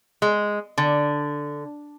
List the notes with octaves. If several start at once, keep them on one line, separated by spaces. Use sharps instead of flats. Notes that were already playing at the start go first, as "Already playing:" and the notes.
G#3
D3